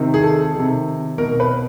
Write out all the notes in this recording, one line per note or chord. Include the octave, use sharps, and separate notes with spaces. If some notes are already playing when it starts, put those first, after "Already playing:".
Already playing: C3 D#3
G#4
A4
C3 D#3
B2 A#4
B4